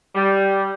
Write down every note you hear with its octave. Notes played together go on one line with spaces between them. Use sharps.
G3